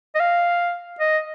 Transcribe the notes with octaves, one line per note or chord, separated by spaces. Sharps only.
D#5
F5
D#5